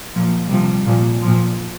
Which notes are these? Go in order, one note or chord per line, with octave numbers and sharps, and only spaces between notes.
A#2 F3
C3 F3 G3
A#2 F3
A#2 F3